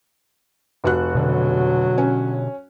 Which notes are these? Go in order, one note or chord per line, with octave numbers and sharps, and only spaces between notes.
F1 F#4 F#6
B2 D3 F#3
C#4